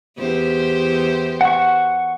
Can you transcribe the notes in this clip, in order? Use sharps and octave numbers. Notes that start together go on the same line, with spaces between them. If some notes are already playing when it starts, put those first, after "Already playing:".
E2 G4 C5
F#5 C#6